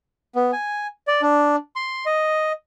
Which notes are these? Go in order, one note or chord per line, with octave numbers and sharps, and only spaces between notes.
B3
G#5
D5
D4
C6
D#5